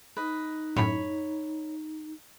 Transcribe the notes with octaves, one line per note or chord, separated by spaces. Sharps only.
D#4 B4 D#5
F#2 A2 C#5 B5